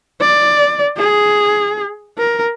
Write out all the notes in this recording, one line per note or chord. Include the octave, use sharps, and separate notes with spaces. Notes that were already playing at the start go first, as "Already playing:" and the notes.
D5
G#4
A#4